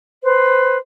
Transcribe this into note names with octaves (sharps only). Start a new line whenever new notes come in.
B4 C5